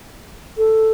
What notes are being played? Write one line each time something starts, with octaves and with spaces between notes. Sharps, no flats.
A4